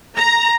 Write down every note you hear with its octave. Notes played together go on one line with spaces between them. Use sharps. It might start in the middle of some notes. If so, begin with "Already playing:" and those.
A#5